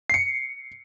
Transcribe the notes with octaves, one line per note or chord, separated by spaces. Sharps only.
C7 C#7